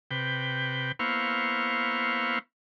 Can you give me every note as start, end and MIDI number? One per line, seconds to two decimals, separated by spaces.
0.11 0.92 48
0.11 0.92 71
0.11 0.92 79
0.99 2.39 58
0.99 2.39 59
0.99 2.39 64
0.99 2.39 72
0.99 2.39 77
0.99 2.39 85